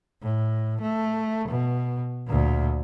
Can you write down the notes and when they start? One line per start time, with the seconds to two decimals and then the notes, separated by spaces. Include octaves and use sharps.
0.22 A2
0.82 A3
1.49 B2
2.27 D2 A#2